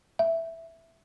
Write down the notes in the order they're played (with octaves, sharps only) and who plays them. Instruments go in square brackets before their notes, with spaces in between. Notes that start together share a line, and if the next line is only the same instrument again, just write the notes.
[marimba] E5